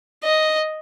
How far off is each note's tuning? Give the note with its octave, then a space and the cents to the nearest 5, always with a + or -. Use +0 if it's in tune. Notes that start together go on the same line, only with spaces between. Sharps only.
D#5 +0